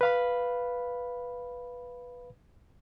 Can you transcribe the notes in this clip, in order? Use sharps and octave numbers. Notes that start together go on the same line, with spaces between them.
B4 F5 B5